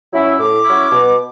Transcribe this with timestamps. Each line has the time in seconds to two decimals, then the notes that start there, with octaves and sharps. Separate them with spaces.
0.12 F#3 C#4 E4
0.28 E6
0.39 A2 D6
0.65 F#3 C#4 E4
0.91 B2